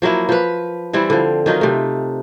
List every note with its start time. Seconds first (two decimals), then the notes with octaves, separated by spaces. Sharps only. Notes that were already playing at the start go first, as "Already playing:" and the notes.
0.02 F3 F#3 A#3 E4
0.29 F3 B4
0.93 E3 G3 C4 E4
1.10 D3 F3
1.46 D#3 F#3 D#4 F4
1.61 C3 A3